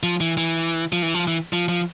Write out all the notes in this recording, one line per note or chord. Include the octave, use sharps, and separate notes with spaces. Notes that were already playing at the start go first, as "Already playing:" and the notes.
F3
E3
E3
F3
E3
F3
E3
F3
F3